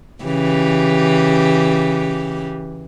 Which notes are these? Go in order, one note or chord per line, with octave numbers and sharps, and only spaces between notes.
C#3 E3 G4